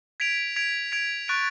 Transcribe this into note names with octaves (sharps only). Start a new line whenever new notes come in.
G#6 B6 D7 F7
G#6 B6 D7 F7
G#6 B6 D7 F7
C#6 F#6 A6 D7